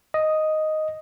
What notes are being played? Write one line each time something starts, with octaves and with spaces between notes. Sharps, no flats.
D#5